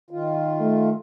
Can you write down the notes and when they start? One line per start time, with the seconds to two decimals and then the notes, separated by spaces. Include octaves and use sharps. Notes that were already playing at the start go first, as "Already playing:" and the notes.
0.11 D#3 F4
0.60 A3